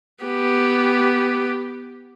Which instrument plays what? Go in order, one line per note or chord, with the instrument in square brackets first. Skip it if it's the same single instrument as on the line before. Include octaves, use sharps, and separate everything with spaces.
[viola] B3 G4